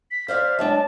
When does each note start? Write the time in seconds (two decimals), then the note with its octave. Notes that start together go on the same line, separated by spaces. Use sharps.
0.11 B6
0.28 C5 D5 E5 F5
0.59 F#3 G#3 D4 A5